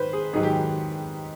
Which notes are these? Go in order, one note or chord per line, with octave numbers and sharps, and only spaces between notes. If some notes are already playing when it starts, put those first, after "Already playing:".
Already playing: G#2 D#3 B4 C5
G#4
G#2 D#3 F#3 G#4
G4